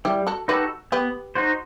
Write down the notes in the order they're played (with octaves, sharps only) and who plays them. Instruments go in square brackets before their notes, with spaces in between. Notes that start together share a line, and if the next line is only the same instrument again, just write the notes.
[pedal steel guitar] G3 [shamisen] E4 G4
[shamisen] F#4 A4
[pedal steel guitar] D#4 F#4 A4 [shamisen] G4 B4
[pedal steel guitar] B3 [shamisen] G4 B4
[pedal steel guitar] D#4 F#4 C5